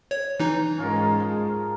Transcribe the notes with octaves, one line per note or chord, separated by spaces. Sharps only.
C#5
E3 D#4
G#2 G#3 C#4 F4 A#4
F3